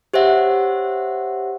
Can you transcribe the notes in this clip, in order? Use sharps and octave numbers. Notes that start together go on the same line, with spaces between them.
G4 C5 C#5 E5 F#5